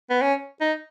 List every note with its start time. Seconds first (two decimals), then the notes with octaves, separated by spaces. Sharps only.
0.10 B3
0.22 C#4
0.61 D#4